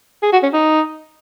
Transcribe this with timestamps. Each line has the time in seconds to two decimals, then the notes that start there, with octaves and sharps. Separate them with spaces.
0.23 G#4
0.33 F#4
0.43 C#4
0.53 D#4